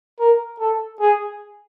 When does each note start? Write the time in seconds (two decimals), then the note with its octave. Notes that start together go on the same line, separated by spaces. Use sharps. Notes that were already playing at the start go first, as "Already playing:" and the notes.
0.20 A#4
0.60 A4
1.00 G#4